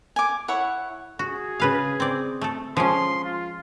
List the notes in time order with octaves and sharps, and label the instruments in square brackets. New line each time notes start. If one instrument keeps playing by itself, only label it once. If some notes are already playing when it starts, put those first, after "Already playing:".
[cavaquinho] G#5 D6
E4 C#5 F#5
[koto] F#4 [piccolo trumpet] G#4
[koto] C#3 B4 F5
C4 D5
A3 A4
[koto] F3 G#3 C#4 [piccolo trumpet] C6
[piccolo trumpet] F4